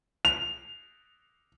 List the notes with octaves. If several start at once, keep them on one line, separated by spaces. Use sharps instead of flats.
F7